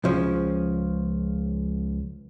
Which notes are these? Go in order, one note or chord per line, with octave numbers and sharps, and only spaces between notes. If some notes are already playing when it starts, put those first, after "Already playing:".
C#2 F3 C#4